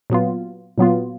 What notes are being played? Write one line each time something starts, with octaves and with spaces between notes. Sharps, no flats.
A#2 F#3 B3 F4
A#2 F#3 B3 F4